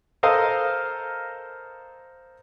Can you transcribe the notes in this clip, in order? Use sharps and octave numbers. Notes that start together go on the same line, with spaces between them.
A4 A#4 C5 D#5 F5